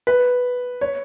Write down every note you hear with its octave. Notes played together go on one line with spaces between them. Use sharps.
B4
C#5